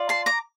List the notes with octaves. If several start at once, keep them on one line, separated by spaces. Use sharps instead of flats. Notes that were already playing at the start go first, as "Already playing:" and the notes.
Already playing: F4 D5
A5 C6
A#5 D6